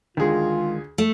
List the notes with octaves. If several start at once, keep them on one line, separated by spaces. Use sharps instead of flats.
D2 D#3 G#3 F4 G#4
A3